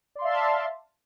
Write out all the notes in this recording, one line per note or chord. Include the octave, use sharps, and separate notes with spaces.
D5 E5 F5 A5 C6